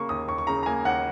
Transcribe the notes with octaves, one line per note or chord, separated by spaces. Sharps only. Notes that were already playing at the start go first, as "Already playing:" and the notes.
Already playing: C#3 A#3 C#6
D#2 D#6
D#2 C#6
C#6
C#3 A#5
A#5
A#3 G#5
D#2 F#5